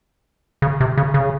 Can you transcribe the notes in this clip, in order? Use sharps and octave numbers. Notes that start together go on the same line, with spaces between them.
C#3
C3
C#3
C#3